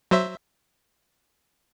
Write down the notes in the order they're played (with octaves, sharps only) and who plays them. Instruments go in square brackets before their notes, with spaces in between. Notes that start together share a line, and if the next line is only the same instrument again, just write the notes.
[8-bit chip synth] F#3 C5 E5